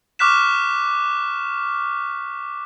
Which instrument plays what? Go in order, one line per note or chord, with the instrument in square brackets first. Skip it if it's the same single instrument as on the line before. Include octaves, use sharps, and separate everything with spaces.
[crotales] C#6 D6 F6 F#6 B6 E7